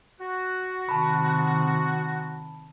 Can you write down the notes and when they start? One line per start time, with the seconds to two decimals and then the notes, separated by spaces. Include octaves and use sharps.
0.20 F#4
0.89 C3 D#3 A5 B5